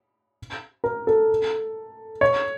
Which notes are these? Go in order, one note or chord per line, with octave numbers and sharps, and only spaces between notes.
A#4
A4
C#5